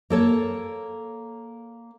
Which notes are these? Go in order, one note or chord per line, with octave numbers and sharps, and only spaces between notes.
A#3 A4 C#5